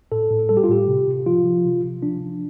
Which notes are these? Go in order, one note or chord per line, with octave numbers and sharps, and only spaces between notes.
A2 A4
A2
G3 A4
G4
F4
A2 G4
C3
C3
F3 F4
F3
C3
C3
F3 D4
F3